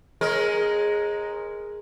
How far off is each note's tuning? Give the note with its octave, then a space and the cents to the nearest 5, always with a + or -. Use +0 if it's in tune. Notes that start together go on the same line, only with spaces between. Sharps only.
G#3 +0 C#4 -45 A#4 +0